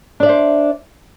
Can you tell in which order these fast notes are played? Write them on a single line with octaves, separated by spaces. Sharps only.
D4 D5 E5 C5